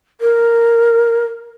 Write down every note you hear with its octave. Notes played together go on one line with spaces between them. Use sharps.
A#4